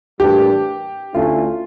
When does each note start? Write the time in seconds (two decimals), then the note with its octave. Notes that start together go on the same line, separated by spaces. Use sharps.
0.20 A2 E3 G3 A#3 D4 G4
1.14 D2 D3 A3 C#4 E4 F4